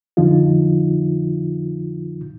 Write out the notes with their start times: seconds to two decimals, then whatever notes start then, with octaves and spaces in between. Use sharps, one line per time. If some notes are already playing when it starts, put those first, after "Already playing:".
0.17 F2 D3 F3 D#4 F4